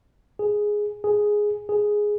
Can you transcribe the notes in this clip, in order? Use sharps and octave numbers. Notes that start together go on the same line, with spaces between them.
G#4
G#4
G#4